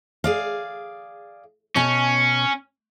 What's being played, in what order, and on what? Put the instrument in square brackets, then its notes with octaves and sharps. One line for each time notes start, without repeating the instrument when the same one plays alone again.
[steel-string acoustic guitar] G#4 D5 F5
[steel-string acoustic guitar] B2 G#5 [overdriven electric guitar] C#4